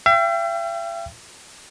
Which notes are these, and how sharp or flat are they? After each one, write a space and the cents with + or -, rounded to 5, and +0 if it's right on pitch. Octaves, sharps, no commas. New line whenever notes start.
E5 +45 G5 -5